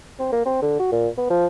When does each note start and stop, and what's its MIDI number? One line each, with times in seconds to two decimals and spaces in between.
0.19 0.31 60
0.32 0.43 58
0.46 0.58 60
0.62 0.75 50
0.79 0.89 66
0.92 1.08 46
1.18 1.30 59
1.30 1.47 53